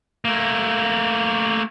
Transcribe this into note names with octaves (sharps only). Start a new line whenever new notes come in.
A3 A#3